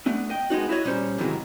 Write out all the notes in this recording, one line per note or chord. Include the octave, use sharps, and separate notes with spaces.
A3 B3 D4
D#5 G5
G#3 B3 D#4 F#4
E4 F#4 C5 C#5 D#5
A#2 G3 C#4 G#4 C5 C#5
G#2 C3 D#3 E3 F#3 G#3